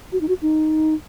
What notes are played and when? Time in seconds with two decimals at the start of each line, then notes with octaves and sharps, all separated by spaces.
0.13 F#4
0.21 D#4
0.29 F#4
0.42 D#4